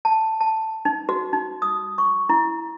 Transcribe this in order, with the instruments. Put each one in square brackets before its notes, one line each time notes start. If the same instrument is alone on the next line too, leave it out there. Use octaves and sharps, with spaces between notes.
[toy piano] A5
A5
D#4
F#4
D#4
D#6
C#6
E4